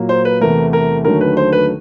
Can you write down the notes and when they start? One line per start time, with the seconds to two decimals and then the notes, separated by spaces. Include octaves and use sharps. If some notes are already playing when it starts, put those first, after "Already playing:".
Already playing: A#2 F#3 A#3
0.09 C5
0.25 B4
0.40 E2 C3 E3 A3 A#4
0.73 A#4
1.05 D#2 D3 F#3 A3 A#4
1.21 B4
1.37 C5
1.52 B4